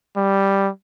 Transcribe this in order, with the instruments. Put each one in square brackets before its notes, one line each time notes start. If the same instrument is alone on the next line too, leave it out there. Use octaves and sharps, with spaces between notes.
[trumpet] G3